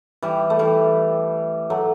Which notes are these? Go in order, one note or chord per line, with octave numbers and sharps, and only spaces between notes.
E3 G3
A3
E3 G3
F#3 A3